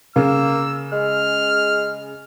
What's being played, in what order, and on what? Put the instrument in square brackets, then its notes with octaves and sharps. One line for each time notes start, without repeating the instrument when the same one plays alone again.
[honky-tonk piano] C#3 [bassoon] A#3 [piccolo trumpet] E6
[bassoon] G#3 [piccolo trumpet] F6